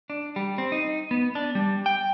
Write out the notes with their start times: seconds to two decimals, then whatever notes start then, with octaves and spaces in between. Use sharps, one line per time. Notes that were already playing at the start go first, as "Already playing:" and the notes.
0.10 D4
0.36 G3
0.58 C4
0.72 D#4
1.11 B3
1.35 D4
1.55 G3
1.86 G5